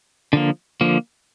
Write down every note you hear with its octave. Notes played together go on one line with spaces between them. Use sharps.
D3 F3 A#3
D3 F3 A#3